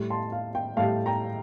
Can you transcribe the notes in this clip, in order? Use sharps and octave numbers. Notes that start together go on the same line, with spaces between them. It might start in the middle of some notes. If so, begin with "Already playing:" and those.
Already playing: A2 G3
A5 C6
F5
G5
A2 G3 F5 A5
G5 A#5